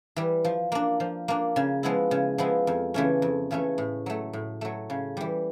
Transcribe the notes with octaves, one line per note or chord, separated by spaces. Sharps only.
E3 G3
F3
A#3 D4
F3
A#3 D4
C#3
F3 G#3 B3 E4
C#3
F3 G#3 B3 E4
F2
C#3 E3 A3 C#4
F2
C#3 E3 A3 C#4
A2
F#3 A3
A2
F#3 A3
C#3
E3 G3